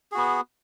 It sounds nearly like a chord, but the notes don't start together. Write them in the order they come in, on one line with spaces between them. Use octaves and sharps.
G#4 F#4 B3